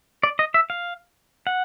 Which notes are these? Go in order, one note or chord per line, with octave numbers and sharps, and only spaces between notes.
D5
D#5
E5
F5
F#5